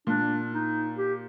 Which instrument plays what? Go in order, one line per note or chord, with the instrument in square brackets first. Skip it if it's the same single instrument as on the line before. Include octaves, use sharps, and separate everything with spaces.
[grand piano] A#2 [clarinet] D4
[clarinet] D#4
G4